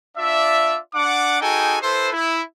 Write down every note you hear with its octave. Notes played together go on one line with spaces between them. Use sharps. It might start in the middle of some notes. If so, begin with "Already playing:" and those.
D4 F4 D5 E5
D4 F#5 D6
D#4 F#4 G#4 A4 G5 G#5
E4 A4 B4 C5
E4